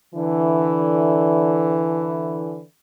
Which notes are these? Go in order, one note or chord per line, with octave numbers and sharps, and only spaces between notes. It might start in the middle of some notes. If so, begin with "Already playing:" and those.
D3 E3